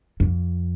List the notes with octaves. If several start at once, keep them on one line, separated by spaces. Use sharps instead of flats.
F2